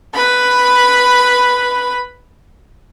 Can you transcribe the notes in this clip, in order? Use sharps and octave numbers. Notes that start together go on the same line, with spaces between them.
B4 B5